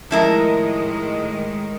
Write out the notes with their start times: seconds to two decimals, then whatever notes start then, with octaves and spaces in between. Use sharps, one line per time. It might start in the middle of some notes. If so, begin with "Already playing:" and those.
0.11 A2 D#3 F3 G#3 E4 A#4